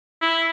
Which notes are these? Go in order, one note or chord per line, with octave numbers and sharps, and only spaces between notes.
E4